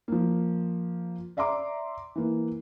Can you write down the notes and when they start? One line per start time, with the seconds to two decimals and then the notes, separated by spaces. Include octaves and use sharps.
0.08 F3 A#3
1.37 D5 E5 A#5 C6 D6
2.16 E3 A#3